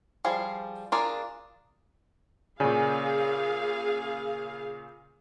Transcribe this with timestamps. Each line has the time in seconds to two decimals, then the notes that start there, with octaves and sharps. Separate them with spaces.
0.25 F3 G3 G#4 F5
0.92 D4 F4 G#4 A#4 D5
2.60 A#2 C#3 C#4 G#4 D5 F5 G#5